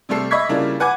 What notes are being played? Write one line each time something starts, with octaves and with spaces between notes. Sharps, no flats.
C3 G3 A3 A4 C7
D#5 E5 B5 C#6 G#6 B6
C#3 G3 A#3 D4 E4 F4
B4 F#5 G#5 D6 G#6